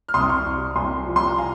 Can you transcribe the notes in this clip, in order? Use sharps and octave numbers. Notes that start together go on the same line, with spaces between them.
F6
C2 C6 D#6
C#6 F6
C2
C2 G#5 C6
F3
C6
A#5
F5 G#5